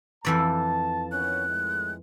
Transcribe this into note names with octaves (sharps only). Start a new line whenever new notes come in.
F2 E3 D5 A5
D#3 B3 C#4 F#6
A2 D#3 G#3